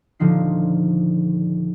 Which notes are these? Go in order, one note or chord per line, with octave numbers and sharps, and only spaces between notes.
D#1 D3 F3 D#4 C7